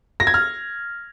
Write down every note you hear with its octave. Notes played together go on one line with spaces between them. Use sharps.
A#6
G#6
F6